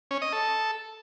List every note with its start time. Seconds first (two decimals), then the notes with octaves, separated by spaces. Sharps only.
0.11 C#4
0.22 D#5
0.33 A4